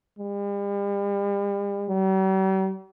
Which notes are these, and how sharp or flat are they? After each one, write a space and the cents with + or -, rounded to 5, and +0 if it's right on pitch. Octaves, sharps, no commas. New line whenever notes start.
G3 +40
G3 -45